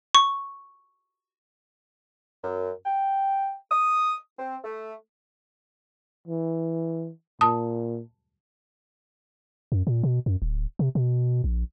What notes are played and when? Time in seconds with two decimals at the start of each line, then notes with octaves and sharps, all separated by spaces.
0.15 C#6
2.44 F#2
2.86 G5
3.71 D#6
4.39 C4
4.64 A3
6.28 E3
7.41 A#2 A5 D#6
9.72 F#2
9.87 A#2
10.03 B2
10.26 F#2
10.42 D1
10.79 C3
10.95 B2
11.44 A#1